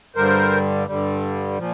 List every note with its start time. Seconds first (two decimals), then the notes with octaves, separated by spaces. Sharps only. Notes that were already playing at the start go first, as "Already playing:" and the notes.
0.15 G2 D3 G3 A#4 C5
0.87 G2 D3 G3
1.58 A#2 F3